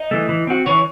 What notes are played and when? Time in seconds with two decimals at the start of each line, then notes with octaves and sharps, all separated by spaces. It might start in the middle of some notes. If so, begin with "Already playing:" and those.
Already playing: D#4 D#5
0.11 E3 A3
0.29 E3
0.47 C4 F#4
0.66 E3 C#4 C#5